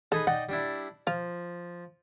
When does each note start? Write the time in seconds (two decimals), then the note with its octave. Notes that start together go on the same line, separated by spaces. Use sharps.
0.12 D#4 G#4 A4 B4
0.27 D#4 D5 F#5 G5
0.49 G3 D4 E4
1.07 F3 F4